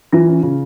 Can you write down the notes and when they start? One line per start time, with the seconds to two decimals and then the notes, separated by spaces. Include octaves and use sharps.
0.13 E3 F4
0.28 C#4
0.43 C#3